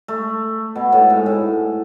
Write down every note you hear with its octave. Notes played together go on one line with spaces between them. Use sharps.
A3
B2
A2
G#2
A2